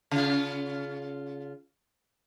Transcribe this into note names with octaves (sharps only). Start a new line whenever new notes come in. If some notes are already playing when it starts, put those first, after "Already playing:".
C#3 F4